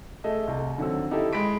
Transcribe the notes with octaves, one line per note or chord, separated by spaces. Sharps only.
A3 G#4 D#5 E5
C2
D3 D#3 F#3 C4 E6
D#4 E4 G4 A4 E5
G#3 B5 B6 D7